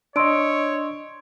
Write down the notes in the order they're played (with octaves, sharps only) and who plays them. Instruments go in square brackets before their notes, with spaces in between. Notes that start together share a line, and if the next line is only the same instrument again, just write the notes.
[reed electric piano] D4 D#5 [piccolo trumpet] C#5 [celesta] C6 E6 D7